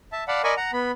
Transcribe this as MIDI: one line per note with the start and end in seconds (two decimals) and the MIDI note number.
0.12 0.24 76
0.12 0.24 81
0.28 0.42 74
0.28 0.42 77
0.28 0.42 78
0.28 0.42 81
0.28 0.42 83
0.44 0.54 70
0.44 0.54 74
0.44 0.54 75
0.44 0.54 80
0.44 0.54 83
0.44 0.54 85
0.57 0.71 78
0.57 0.71 82
0.73 0.92 59
0.73 0.92 83